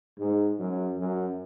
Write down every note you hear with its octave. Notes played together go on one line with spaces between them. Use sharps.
G#2
F#2
F#2